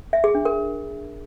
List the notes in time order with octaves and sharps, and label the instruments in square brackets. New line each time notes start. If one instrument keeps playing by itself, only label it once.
[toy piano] E5
G#4
D4
A#4